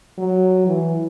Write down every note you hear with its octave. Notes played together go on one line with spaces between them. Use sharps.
F#3
E3